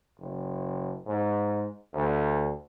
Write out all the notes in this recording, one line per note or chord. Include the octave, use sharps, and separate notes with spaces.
F#1
G#2
D2